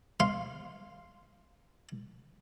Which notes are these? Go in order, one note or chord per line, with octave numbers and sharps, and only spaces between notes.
F5 C6